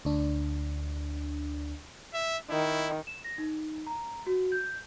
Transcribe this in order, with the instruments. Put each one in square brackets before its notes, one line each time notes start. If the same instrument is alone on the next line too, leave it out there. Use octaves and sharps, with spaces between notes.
[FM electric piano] D2 D4
[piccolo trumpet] E5
[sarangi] D#3 [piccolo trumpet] E4
[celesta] E7
A#6
D#4
A#5
F#4
G6